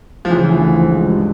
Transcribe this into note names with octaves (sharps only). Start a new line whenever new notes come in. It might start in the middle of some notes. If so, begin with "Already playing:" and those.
F3
C#3 E3
D2
F3
G#3
G2